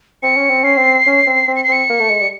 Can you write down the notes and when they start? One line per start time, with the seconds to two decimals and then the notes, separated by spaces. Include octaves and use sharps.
0.23 C4 C#7
0.37 C#4
0.50 C4
0.64 C#4 C7
0.78 C4
1.07 C#4
1.27 C4
1.48 C4
1.56 C#7
1.64 C7
1.69 C4 C#7
1.90 A#3
2.00 A3
2.10 G#3
2.21 G3